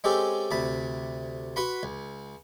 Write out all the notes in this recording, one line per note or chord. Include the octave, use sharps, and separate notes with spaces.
G#3 C4 C#4 G4 A4
D2 C3 A5 B5
F#4 B4 F#5 B5 C6
C#2